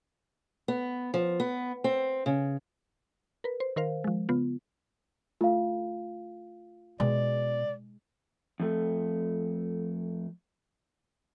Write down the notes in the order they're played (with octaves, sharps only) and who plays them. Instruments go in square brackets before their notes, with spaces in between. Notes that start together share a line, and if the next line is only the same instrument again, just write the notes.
[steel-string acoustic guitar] B3
F3
B3
C4
C#3
[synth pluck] A#4 B4
C5
D#3 A#4 C5 F5
F3 G#3
C#3 B3 F4
[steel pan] A3 [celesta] F4 F5
[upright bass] B2 [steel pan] G#3 [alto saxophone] D5
[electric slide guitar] F2 A3